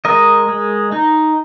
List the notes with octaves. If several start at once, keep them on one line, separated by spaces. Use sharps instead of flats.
G#3 A#4 D#5
G#3
D#4